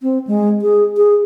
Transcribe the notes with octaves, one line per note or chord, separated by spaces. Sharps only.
C4
G#3
G#4
G#4